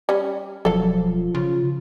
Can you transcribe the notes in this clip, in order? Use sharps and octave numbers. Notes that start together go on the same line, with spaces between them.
G3 C#4
E1 F3 F#3 A4 F5
C#3 F4